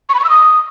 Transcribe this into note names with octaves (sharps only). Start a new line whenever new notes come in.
C#6
B5
C#6
E6
D#6